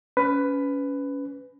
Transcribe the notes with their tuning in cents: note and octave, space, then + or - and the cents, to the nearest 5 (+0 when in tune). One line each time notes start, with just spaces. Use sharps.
C#4 +20 B4 +15